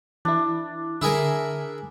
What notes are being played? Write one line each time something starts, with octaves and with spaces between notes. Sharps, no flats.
E3 D4 E4
D3 E4 G#4 A#4 G#5